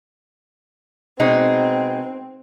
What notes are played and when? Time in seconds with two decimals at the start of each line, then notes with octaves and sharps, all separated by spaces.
1.20 B2 G#3 C4 D#4